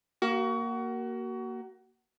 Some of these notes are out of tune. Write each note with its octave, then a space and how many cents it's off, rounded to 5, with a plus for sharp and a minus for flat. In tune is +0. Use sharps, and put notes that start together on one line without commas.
A#3 +0 F#4 +30